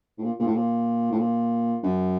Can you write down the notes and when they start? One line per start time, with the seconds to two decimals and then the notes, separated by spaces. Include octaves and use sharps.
0.18 A2
0.23 A#2
0.39 A#2
0.47 A2
0.55 A#2
1.12 A2
1.19 A#2
1.83 F#2